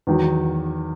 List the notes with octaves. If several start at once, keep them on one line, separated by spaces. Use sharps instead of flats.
E2 D#3 F#3